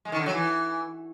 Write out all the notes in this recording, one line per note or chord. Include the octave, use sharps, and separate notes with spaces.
G#3
D#3
D3
F#3
E3